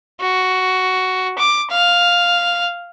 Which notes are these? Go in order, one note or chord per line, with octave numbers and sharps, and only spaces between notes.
F#4
D6
F5